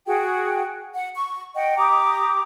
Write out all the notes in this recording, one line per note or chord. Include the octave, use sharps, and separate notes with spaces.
F#4 G#4 F#5 G5
F#5
C#6
D#5 F#5 G5
G4 A#5 D6 D#6